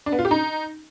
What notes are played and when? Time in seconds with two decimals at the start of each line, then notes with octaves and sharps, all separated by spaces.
0.06 D4
0.12 B3
0.19 F4
0.25 G4
0.31 D#4